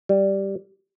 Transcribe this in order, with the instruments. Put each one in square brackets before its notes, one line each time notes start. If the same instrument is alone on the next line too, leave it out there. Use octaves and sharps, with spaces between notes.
[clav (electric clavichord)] G3